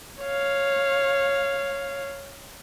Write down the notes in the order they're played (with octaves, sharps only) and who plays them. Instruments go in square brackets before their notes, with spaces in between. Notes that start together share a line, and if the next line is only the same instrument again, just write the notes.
[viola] C#5 F5